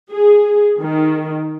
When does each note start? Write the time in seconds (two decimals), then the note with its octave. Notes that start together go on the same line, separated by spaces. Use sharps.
0.12 G#4
0.81 D#3